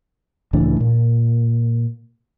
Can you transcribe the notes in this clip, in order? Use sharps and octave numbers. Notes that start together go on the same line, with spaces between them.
C#2 A2 E3 D4
A#2